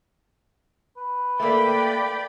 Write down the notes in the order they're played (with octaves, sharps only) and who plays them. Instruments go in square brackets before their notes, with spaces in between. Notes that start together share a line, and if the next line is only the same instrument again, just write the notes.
[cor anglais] B4
[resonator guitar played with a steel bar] A3 A#3 [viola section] D5 G5 B5